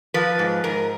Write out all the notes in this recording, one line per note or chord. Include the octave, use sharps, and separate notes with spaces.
F3 B4
G#2
G#2 A#4